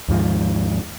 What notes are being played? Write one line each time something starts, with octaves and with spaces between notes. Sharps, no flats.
D#2 G#2 F3